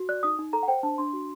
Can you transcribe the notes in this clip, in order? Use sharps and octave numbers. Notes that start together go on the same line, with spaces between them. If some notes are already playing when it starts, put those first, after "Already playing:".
Already playing: F#4
D5 F#6
D#4 D#6
D#4
A4 A#5
F#5
C5 G5
D4 A5
D4 C6
F#4